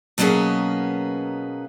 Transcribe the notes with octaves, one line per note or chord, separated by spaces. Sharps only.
B2 F#3 A#3 B3 C#4 G#4